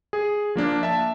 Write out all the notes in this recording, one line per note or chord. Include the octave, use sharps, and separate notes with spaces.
G#4
F3 A#3 D4
E5 A5